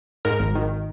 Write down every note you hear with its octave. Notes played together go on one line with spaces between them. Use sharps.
G#2 A#4
G#1
D#3